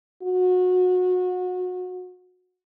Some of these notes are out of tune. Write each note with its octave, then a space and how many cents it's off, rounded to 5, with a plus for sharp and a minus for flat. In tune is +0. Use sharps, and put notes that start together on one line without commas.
F#4 -25